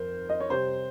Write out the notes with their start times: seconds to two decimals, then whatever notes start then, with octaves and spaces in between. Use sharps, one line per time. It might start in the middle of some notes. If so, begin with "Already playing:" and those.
Already playing: F2 D#3 A#4 C5
0.29 D#5
0.40 C#5
0.50 C3 G3 C4 C5